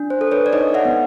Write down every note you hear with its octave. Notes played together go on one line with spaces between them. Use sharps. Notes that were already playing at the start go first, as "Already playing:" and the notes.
Already playing: D4
C5
A4
B4 C#5
D5
D#4 C#5 D#5
E5 F#5
B3